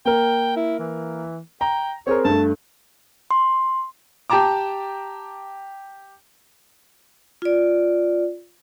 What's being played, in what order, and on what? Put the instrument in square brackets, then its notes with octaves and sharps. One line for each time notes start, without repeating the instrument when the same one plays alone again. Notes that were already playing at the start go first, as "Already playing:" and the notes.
[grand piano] A#3 A#4 [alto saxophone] G5
[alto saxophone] E4
E3
[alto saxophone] G5 [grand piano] A#5
[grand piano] C4 G#4 A#4 [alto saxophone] C#5
[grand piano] G2 A3 [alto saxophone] A5
[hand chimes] C6
[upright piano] G4 G5 A5 A#5 D6
[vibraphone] F4 D5